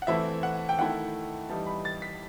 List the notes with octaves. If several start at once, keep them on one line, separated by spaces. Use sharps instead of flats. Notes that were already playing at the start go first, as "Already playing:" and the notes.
F#5
E3 A3 C4 E4 E5
F#5
G5
D#3 A3 E4 F#5
E3 G3 D#4 A5
B5
A6
B6